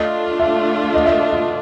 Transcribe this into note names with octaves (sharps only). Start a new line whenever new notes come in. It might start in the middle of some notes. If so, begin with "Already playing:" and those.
Already playing: A3 D4 F4 D#5
E5
D#5
E5
D#5
D#5